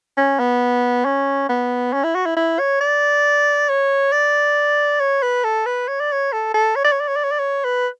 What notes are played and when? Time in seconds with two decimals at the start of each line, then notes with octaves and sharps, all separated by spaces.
0.17 C#4
0.39 B3
1.05 C#4
1.49 B3
1.93 C#4
2.04 E4
2.15 F#4
2.26 E4
2.36 E4
2.59 C#5
2.81 D5
3.69 C#5
4.12 D5
5.00 C#5
5.23 B4
5.44 A4
5.66 B4
5.88 C#5
6.00 D5
6.12 C#5
6.32 A4
6.54 A4
6.76 C#5
6.85 D5
6.92 C#5
7.00 D5
7.08 C#5
7.16 D5
7.24 C#5
7.31 D5
7.39 C#5
7.65 B4